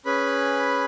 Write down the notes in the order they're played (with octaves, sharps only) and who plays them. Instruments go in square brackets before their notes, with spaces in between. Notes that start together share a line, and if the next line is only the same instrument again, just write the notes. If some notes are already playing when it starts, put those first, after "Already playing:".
[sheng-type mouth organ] C#4 G#4 B4 B5